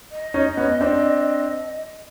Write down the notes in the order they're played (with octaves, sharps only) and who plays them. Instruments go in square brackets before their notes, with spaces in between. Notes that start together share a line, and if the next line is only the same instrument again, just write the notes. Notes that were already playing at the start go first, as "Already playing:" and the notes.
[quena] D#5
[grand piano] C#4 D#4
B3 C#4
C4 D4